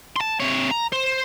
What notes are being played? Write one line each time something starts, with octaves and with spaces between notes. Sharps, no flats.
A5 C6
C3 C#5
A#5
C5